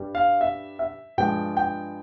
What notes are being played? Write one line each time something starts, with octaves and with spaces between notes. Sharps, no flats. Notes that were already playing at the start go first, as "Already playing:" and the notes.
Already playing: G2 G3
F5
E5
E5
G2 F3 G#3 G5
G5